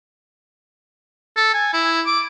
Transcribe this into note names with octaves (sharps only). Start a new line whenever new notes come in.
A4
G#5
E4
D6